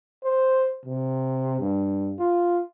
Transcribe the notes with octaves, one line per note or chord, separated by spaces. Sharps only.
C5
C3
G2
F4